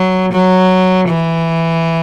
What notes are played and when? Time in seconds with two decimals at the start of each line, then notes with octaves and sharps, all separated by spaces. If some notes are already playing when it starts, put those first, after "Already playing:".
Already playing: F#3
0.33 F#3
1.09 E3